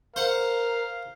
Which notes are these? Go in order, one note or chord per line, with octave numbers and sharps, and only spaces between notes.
A#4 C5 F5 F#5